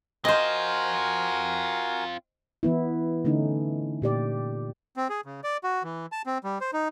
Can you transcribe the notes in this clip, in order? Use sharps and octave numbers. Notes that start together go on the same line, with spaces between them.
C4 F4 F#4 A#4 C5 D#5 G#5
E3 B3 E4
D3 A3 C#4 D#4
A#2 G4 D5
C4
G#4
C#3
D5
F#4
E3
A5
C4
G3
C5
D#4